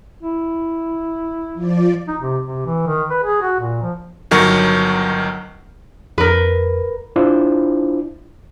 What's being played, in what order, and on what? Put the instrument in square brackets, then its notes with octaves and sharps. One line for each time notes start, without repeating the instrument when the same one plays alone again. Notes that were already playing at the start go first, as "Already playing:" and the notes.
[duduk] E4
[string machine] F3 D5
[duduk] D#4
C3
C3
E3
D#3
B4
G#4
F#4
A#2
F3
[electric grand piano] G1 D#3 F#3 A#4 C#6
[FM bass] F2 [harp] A#4 B4
[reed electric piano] D4 E4 F4 C5